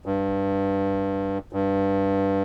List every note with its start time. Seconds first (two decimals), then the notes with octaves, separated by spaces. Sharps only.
0.06 G2
1.53 G2